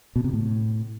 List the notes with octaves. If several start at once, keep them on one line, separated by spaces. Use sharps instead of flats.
B2
C3
A2